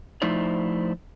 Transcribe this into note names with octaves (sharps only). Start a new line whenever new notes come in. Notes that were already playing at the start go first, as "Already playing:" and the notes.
F3 A3 D#4 E4 C5 D5